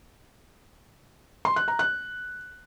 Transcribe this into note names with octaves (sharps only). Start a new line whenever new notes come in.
C6
F#6
A#5
F#6